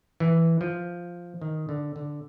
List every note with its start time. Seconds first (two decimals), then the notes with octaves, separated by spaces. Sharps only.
0.20 E3
0.61 F3
1.42 D#3
1.69 D3
1.96 D3